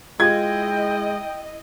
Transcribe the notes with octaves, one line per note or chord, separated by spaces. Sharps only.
G#3 E4 F4 D#5 G5 G#6